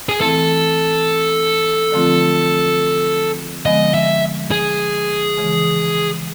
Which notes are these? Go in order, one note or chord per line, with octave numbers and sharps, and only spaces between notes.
G#4
E3 A3 C4 E4 A4
D3 F3 A3 C4 F4
D3 F3 G#3 B3 D#5
E5
G#4
C#3 E3 G#3